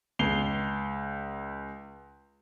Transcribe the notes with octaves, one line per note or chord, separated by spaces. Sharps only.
C#2 C7 F7 G7